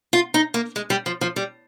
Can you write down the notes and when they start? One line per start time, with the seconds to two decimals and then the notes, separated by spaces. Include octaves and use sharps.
0.13 F4
0.34 D#4
0.54 A#3
0.76 G#3
0.90 G3
1.06 F3
1.21 F3
1.36 G3